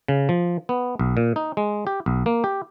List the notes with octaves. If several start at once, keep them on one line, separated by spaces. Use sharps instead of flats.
C#3
F3
B3
B1
A#2
D#4
G#3
G4
B1
A#3
G4